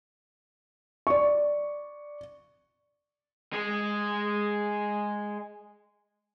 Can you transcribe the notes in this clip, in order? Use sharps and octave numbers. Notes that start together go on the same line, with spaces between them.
D5 C#6
G#3 G#4